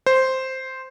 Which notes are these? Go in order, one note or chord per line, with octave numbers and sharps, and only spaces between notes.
C5